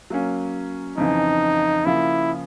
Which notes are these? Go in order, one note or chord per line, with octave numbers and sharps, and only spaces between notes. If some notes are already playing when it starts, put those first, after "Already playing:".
F#3 A#3 C#4
F2 C#3 E3 D#4
C#3 F3 A#3 E4